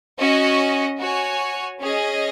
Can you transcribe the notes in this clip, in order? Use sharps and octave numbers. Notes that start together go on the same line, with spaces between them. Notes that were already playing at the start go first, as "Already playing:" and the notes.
C#4 F#4 D#5
F#4 C#5 G#5
C#4 G#4 D#5